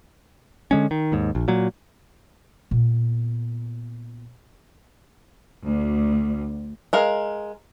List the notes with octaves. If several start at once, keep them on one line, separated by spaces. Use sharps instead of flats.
D3 G#3 C#4
D#3
D#2 G#2
A#1
A#2 F#3
A#2 B3
D2
G#3 A#4 F5